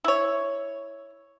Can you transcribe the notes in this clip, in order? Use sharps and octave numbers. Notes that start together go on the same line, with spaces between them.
E4 C#5